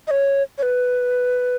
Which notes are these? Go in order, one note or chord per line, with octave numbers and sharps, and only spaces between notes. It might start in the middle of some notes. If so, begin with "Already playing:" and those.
D#5
C#5
C#5
B4